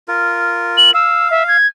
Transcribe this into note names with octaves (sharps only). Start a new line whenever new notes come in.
F4 A#4
F#7
F5 E6
E5
G#6